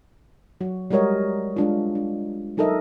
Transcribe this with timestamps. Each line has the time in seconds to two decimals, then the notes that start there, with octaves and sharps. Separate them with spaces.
0.61 F#3 F#4
0.90 G3 G#3 F#4 A#4 C#5 D#5
1.56 G#3 D4 F4
1.95 D4
2.57 F#3 D#4 A4 A#4 D#5 E5